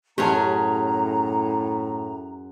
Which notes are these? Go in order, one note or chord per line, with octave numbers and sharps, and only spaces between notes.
F#2 A2 C#4 G4 G#4 C#5 A5 A#5